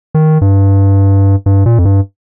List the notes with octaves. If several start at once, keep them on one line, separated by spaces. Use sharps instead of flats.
D#3
G2
G2
A#2
F2
G2